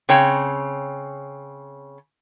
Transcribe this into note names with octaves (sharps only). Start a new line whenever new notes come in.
C#3 C4 C#5 G5